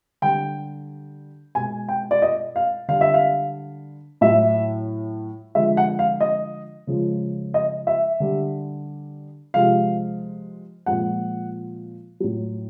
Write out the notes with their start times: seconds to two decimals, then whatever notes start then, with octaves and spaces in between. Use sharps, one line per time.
0.22 D3 G3 G5
1.55 B2 G#3 G#5
1.89 G5
2.11 D5
2.22 D#5
2.56 F5
2.88 D3 G3 F5
3.01 E5
3.14 F5
4.21 A2 F#3 E5
5.55 D3 F3 G#3 E5
5.77 F#5
5.99 F5
6.21 D#5
6.87 C#3 F3 G#3
7.54 D#5
7.87 E5
8.20 D3 G3
9.54 C3 F3 G#3 F5
10.86 A#2 F3 G#3 F#5
12.20 A2 F#3